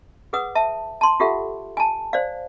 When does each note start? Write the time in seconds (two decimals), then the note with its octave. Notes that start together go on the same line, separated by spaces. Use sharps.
0.33 G#4 B4 F#5 D#6
0.55 E5 A5
1.01 A5 C6
1.20 F4 G4 A4 E5 F#5
1.77 G#5 A5
2.13 C5 D5 F5